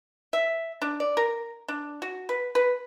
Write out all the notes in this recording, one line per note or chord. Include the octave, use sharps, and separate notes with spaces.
E5
D4
D5
A#4
D4
F#4
B4
B4